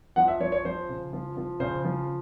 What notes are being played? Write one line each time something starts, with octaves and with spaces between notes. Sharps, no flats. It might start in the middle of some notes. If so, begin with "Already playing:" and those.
F3 F#5
E5
F3 C#5
C#5
F3 C5
C#3
F3
F3
C#3 C5
F3